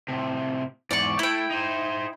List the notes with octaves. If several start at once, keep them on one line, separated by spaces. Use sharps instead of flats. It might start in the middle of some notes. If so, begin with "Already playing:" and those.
A2 C3
E2 G#2 D5 C#6
A3 E4 G5
D#4 C5